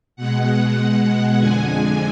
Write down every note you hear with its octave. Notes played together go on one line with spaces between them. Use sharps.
B2 G#3 F#5
F2 D3 G#3 G#5